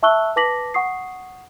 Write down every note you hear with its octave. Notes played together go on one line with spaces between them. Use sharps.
E5 A5 C#6 E6 F#6 G7
B4 A5 D6 A#6 B6 F#7
F#5 C#6 D#6 C7